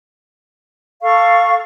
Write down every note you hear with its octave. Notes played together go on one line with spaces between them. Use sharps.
A4 F5 C#6